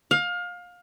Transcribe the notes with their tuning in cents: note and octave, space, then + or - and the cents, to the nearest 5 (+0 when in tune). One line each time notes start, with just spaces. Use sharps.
F5 +25